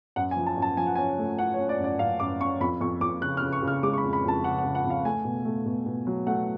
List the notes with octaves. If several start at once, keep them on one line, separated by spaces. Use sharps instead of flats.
F#2 F#5
G#5
F3
A5
F#2
A5
F3 G#5
F#5
C#4 G#5
A3
C#4 F#5
C#5
C#4
D5
F#2
D5
F#2 F5
F#2 D6
C#4 C#6
F2 B5
F2 C#6
F2 D6
C#3 F#6
F6
C#3
C#6
C#3
F6
G#3 D6
C#6
B5
F2
B5
F2 A5
C#3 F#5
F#5
C#3
F#5
F2
F5
A3 G#5
B2
A3
B2
B2
F#3
A3 F#5